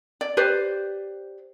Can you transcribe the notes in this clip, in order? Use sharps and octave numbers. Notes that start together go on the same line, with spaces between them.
D5
G4 B4 C5 D5